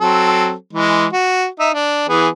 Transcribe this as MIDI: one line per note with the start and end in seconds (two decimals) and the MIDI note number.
0.01 0.52 54
0.01 0.52 60
0.01 0.52 69
0.73 1.07 52
0.73 1.07 56
1.13 1.46 66
1.60 1.70 63
1.60 1.70 76
1.74 2.06 62
2.09 2.28 52
2.09 2.28 59
2.09 2.28 68